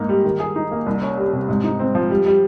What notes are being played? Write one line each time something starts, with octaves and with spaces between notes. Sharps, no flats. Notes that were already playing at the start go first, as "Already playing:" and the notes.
Already playing: G#2 A#3 D#4
G3
D#3
G#4
D#4
A#3
C2
C#4
G3
C3
G#2
D#4
C4
F3
G3
G3